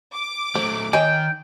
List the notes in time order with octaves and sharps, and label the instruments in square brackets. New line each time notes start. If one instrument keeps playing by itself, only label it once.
[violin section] D6
[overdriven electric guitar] F#3 A3 [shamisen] C5
[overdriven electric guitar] D#3 [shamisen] C#5 D#5 G#5 [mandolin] G5